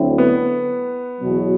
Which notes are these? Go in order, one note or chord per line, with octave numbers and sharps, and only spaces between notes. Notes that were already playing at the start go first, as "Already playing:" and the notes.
Already playing: D2 D3 F#3 C4 E4
B3
E2 B2 F#3